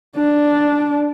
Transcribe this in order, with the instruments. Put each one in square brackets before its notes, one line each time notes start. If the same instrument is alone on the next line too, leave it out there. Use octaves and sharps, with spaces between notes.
[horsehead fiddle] D4